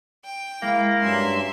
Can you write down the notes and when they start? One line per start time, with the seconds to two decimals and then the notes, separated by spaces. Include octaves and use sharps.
0.24 G5
0.62 G#3 A#3 E4 F5
1.00 G2 F#3 C#4 E5 C6